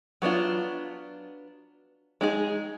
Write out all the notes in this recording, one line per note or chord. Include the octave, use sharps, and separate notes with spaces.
F#3 B3 D4 F4
G#3 D#4 G#4